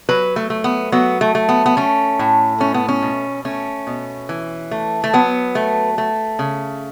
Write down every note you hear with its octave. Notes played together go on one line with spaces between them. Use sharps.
F#3 B4
A3
A3
B3
F#3 B3
A3
A3
B3
B3
A3 C#4
A2
A3 C#4
B3
C#4
B2
A3 C#4
B2
E3
A3
A3
F#3 B3
A3
A3
C#3